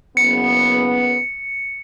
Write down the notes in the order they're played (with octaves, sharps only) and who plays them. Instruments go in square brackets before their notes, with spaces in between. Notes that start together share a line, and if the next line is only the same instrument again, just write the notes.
[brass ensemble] F#1 C#3 B3 [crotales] C#7